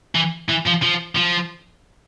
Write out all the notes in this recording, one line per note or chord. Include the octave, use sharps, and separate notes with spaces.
E3
E3
F3
F3
F3